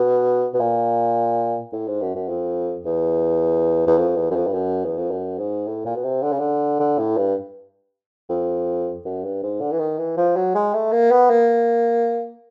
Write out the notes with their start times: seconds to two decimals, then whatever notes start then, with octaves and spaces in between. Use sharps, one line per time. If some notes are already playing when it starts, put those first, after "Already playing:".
Already playing: B2
0.54 B2
0.60 A#2
1.73 A2
1.87 G#2
2.01 F#2
2.15 F#2
2.29 F2
2.85 E2
3.87 E2
3.98 F2
4.16 E2
4.31 F#2
4.35 F2
4.47 G2
4.54 F#2
4.85 E2
4.98 F2
5.11 F#2
5.38 G#2
5.67 A2
5.85 A#2
5.95 B2
6.04 C3
6.23 D3
6.32 C#3
6.39 D3
6.80 D3
6.98 A2
7.17 G2
8.29 F2
9.05 F#2
9.24 G2
9.43 G#2
9.61 D3
9.72 E3
9.79 D#3
9.98 E3
10.17 F3
10.36 F#3
10.55 G#3
10.74 A3
10.92 A#3
11.11 B3
11.30 A#3